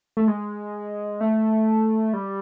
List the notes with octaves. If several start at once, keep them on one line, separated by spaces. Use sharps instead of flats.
A3
G#3
A3
G3